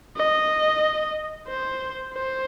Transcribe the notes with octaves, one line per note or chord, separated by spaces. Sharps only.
D#5
C5
C5